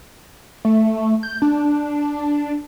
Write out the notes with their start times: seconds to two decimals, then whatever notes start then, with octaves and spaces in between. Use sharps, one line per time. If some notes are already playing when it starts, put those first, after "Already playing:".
0.65 A3
1.23 G6
1.42 D4